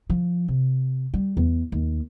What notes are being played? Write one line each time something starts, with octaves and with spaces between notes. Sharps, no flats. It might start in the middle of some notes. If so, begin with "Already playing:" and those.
F3
C3
G3
E2
D#2